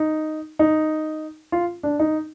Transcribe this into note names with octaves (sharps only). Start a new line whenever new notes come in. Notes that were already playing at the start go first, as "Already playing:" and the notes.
Already playing: D#4
D#4
F4
D4
D#4